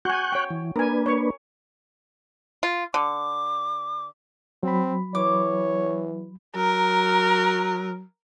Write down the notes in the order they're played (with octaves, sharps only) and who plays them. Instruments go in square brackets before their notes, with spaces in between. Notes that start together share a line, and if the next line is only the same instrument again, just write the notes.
[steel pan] F#4 G#5 [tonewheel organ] C#6 F#6 G6
[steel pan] C#5 G5
[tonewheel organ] E3
[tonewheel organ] A#3 D4 B4 [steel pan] A#4 G#5
[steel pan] C#5 C#6
[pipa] F4
[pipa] D3 [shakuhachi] D6
[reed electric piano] F#3 B5 [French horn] C4
[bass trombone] E3 [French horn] C#5 [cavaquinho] D6
[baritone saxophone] F#3 [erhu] A#4